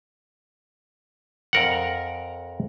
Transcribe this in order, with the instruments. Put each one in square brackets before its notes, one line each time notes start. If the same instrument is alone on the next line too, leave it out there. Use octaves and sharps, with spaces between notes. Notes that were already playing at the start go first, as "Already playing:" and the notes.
[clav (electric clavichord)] F2 A#4 F#5